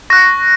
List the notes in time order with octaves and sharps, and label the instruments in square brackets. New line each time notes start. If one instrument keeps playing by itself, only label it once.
[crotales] C#6 F#6 A#6